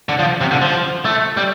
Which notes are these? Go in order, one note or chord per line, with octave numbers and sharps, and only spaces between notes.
D3
F3
C3
D3
F3
A3
G3